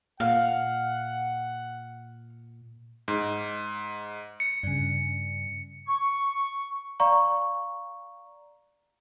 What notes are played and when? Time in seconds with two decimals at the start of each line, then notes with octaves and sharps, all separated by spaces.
0.20 A#2 F5 F#5
3.08 G#2
4.40 C#7
4.63 G2 C#3
5.88 C#6
7.00 D5 F5 A#5 C#6